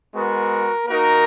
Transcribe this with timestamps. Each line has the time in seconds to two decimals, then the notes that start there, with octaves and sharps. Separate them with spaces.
0.15 G#3 B3 F#4 A#4
0.86 A#3 D#4 F#4 A#4